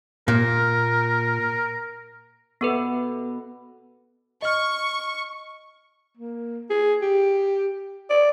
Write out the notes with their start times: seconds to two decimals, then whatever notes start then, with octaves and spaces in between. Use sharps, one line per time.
0.28 A#2 A#4
2.61 B2 B3 A4 B4
4.42 D#5 C#6 F6
6.17 A#3
6.70 G#4
7.02 G4
8.10 D5